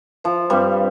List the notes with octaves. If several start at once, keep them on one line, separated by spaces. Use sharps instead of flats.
F3 C5
G2 G3 C4